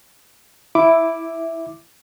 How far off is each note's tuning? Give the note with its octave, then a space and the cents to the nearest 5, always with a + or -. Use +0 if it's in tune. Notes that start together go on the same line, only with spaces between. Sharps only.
E4 +0 E5 -5 D6 +0